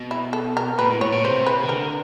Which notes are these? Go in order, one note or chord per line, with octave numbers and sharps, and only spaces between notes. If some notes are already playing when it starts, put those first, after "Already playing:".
Already playing: B2
E4
A4
A#4
A#2 B4
A2
A2 C#5
A#2
C3 C5
B4
D#3
D3 A#4